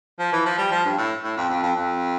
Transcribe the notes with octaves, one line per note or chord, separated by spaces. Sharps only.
F3
E3
F3
G3
F3
G2
A2
A2
F2
F2
F2
F2